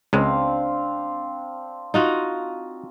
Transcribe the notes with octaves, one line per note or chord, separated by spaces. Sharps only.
C#2 G#3 C4 D4 F5
D#4 F4 F#4